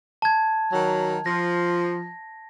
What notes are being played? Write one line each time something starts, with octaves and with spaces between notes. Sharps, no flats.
A5 G#6
D#3 F#3
F3 A#6